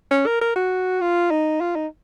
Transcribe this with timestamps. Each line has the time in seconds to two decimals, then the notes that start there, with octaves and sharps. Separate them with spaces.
0.11 C#4
0.26 A#4
0.41 A#4
0.56 F#4
1.01 F4
1.31 D#4
1.61 F4
1.75 D#4